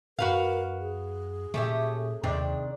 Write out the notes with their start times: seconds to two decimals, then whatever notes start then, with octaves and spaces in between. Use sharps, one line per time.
0.19 F#2 F#4 A#4 B4 F5
0.79 G#4
1.54 A#2 A3 C#4 G4 E5
2.23 D#2 C3 D#3 C4 D4